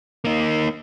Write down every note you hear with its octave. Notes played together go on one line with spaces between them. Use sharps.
A#3 D#4